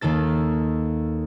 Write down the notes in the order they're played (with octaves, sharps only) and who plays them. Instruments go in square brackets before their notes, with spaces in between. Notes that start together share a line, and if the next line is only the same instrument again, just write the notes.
[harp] D#2 D#3 A#3 A4 A6